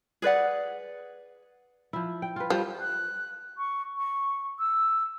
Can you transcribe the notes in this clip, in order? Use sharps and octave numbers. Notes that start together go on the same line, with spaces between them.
G#4 B4 D5 F#5
F3 E4
G5
F4 B4
F3 G3
F#6
C#6
C#6
E6